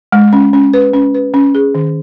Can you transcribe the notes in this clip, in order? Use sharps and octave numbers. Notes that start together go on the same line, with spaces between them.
G#3
C#4
C#4
B4
C#4
B4
C#4
G#4
D#3